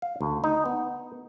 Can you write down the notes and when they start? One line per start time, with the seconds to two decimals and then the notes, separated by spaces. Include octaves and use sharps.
0.02 F5
0.21 D2
0.44 D#4
0.66 B3